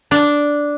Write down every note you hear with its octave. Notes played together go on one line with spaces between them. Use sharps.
D4